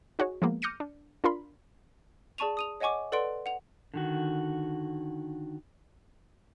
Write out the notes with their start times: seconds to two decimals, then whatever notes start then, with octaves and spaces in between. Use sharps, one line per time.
0.19 D#4 F#4 G#4 C#5
0.42 F3 G#3 A#3 B3
0.62 D6 F6 G6 A#6 C#7 D#7
0.80 D4
1.24 D4 F4 A#4 B5 C6
2.38 G#4 D5 A5 C#6 D#7 F7
2.57 D#6 D#7 F7
2.80 C#5 D#5 F#5 G#5 C#6 D6
3.12 A4 B4 D5 F#5 C6 D7
3.46 F#5 F7
3.94 D3 D#3 F#4